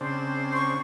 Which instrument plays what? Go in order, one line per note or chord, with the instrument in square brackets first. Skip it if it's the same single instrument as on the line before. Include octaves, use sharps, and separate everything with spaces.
[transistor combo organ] C#3 C4 D4 [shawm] C5
[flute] C#6